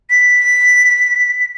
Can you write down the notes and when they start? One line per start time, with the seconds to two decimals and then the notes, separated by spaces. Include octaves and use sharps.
0.10 B6